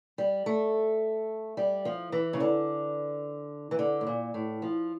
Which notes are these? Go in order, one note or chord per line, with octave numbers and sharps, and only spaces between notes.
G3
A3
G3
F3
E3
C#3
D3
E3
D3
A2
A#2
A2
F3